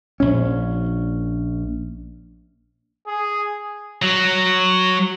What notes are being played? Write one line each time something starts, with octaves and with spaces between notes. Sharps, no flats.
A#1 C#4
G#4
F#3